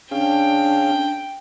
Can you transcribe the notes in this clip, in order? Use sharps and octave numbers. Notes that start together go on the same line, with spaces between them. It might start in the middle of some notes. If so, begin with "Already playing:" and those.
C#4 D4 G#4 F5 G5